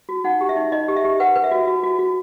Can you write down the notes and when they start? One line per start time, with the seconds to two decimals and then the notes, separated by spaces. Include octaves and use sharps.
0.09 F#4
0.24 D#4 F#5
0.41 G4
0.49 E5
0.57 D#4
0.72 D#4 D#5
0.88 G4
0.96 E5
1.04 G4
1.20 B4 F#5
1.36 B4
1.44 E5
1.51 F#4
1.67 F#4
1.83 F#4
1.99 F#4